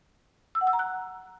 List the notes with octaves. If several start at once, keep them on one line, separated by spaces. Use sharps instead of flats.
E6
F#5
E6
A#5
F#6